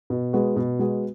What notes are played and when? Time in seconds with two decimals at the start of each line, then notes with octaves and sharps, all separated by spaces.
0.10 B2
0.33 G#3 B3 F#4
0.56 B2
0.79 G#3 B3 F#4